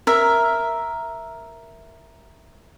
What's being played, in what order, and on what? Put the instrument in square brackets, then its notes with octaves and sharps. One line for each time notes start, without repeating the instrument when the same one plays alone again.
[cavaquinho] A#4 E5